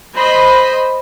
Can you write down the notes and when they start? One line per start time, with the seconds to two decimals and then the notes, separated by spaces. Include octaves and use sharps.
0.15 C5 D#5 B5